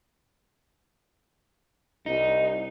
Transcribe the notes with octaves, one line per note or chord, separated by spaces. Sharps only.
C2 D#4